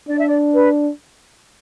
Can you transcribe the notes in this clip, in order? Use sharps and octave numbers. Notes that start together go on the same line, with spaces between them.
D4 D5
E5
D5
B4